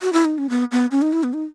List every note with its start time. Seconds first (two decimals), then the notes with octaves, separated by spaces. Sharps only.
0.00 F#4
0.13 E4
0.25 D#4
0.38 C#4
0.50 B3
0.72 B3
0.91 C#4
1.02 D#4
1.13 E4
1.23 B3
1.33 D#4